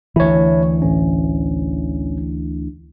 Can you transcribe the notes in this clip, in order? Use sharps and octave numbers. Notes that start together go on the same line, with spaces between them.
D2 E3 E4 C#5
A1 C#4